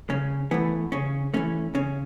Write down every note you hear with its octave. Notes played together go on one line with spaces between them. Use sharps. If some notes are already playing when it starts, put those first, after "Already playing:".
C#3 C#4
E3 A3 B3
C#3 C#4
E3 A3 C#4
C#3 C#4